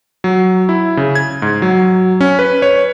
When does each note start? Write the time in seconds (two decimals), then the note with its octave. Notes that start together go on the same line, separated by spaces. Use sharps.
0.24 F#3
0.69 E4
0.97 C#3
1.15 G#6
1.42 G#2
1.62 F#3
2.21 C#4
2.39 B4
2.62 C#5